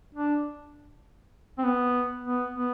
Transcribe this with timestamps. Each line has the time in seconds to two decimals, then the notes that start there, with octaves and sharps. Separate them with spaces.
0.15 D4
1.58 C4
1.64 B3
2.24 B3
2.55 B3